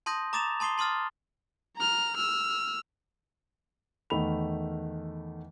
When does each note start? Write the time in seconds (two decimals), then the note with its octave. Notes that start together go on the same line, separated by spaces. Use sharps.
0.06 A5 C6 D#6 G6 A#6
0.33 A#5 D6 D#6 A6 E7 F7
0.60 A5 C6 D#6 C7 G7
0.78 A5 C6 D#6 F6 A6
1.76 A#5 F6
2.17 E6 F6
4.10 E2 D#3 A3 B5 F7